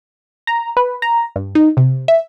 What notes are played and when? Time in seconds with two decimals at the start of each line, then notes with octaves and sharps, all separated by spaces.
0.47 A#5
0.77 B4
1.02 A#5
1.36 G2
1.55 D#4
1.77 C3
2.08 E5